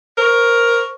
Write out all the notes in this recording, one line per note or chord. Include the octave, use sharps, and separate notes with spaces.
A#4 C5 C#6